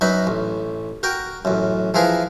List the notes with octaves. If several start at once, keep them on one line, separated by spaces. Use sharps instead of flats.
F#2 F#3 D#4 B4 B5
A1
F#4 A#4 G5
A1 F#2
E3 F3 G#4 A#4 B4